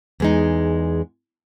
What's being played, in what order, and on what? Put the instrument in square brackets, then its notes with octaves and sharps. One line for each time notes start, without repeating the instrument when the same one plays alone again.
[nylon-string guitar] E2 G#3 D#4